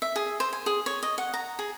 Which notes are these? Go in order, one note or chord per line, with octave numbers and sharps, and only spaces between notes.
E5
G#4
C5
G#5
G#4
C#5
D#5
F#5
A#5
G#4